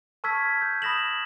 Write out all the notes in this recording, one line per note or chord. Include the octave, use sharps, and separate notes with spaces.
A5 C#6 E6 F6 G#6 B6
G6
B5 D#6 A#6 E7 F#7